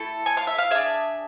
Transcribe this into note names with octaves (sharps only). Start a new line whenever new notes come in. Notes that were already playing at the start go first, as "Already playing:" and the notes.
Already playing: A3 E4 A4
G#5
F5
E5
F5
D4 G#4 E5